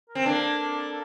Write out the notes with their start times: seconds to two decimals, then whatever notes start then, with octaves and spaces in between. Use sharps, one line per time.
0.09 A#4
0.15 C4
0.26 A#3 D4 A4